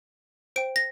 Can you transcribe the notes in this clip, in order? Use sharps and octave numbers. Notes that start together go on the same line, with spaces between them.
C5 G5 D7
A#6